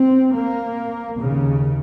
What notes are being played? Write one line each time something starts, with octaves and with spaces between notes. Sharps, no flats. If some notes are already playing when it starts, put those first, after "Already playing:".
Already playing: C4
A#3
D#2 C#3